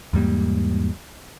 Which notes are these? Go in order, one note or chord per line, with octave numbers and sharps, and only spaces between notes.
E2 G#2 G3 A#3